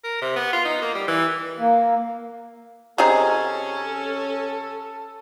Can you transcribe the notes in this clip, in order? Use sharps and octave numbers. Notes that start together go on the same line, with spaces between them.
A#4
C3
B3
F4
D#4
A#3
G3
E3
A#3
C3 C#4 D#4 G#4 A4